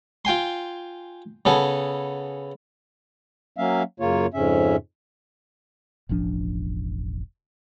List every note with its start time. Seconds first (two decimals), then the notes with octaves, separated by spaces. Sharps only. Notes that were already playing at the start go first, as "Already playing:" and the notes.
0.25 F4 G5 G#5 C6
1.45 C#3 B3 A4 G#5
3.57 F#3 A#3 C#4 E5 F5
4.00 F#2 C#3 A#3 F4 C#5
4.34 F2 G#2 C#3 C#4 E5
6.09 E1 A1 F3 D4